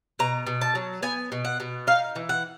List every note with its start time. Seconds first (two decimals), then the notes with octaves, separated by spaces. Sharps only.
0.19 B2 A#5
0.47 B2
0.61 A5
0.75 F#3
1.02 B3 G#5
1.32 B2
1.45 F#5
1.60 B2
1.87 D#4 F5
2.16 E3
2.29 F#5